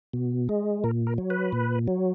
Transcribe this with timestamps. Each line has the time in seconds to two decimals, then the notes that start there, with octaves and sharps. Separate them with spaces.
0.13 B2
0.49 G#3
0.84 A#2 A#4
1.07 A#4
1.18 F#3
1.30 B4
1.52 A#2
1.88 F#3